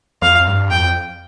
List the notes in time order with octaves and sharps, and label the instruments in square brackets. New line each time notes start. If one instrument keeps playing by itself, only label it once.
[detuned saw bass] F2 [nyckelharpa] F5
[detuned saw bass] F2
G2
[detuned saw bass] F2 [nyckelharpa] G5